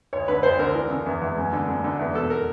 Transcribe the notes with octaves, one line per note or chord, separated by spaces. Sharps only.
D2 C#5
D3 B4
D2 C5
D3 A#4
E3 A#4
C#3
E2
E2
F#2
D3
F#2
D3
E2
B2 A4
A#4